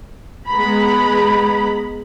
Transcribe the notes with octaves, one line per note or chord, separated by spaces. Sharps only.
G#3 B3 A#5 B5